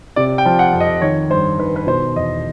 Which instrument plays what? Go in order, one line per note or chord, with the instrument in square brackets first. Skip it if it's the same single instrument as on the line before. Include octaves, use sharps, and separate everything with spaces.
[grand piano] C3 D5
G5
F3
F#5
F2
D#5
D#3 C#5
G2 C5
D#3 B4
B4
B2 C5
E2 D#5